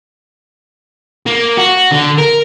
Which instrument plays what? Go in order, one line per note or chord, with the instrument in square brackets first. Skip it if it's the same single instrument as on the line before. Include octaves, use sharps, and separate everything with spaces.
[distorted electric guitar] A#3
F#4
D3
A#4